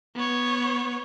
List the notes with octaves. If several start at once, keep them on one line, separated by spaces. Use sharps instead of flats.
B3 C#5